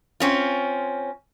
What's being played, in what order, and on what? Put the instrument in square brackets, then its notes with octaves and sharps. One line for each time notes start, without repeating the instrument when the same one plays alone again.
[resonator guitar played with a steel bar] C4 C#4 F4